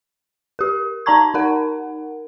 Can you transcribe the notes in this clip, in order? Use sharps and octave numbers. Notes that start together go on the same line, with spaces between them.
G4 A#4
D#4 D5 A5 A#5 C#6 G#6
D#4 A#4 F#5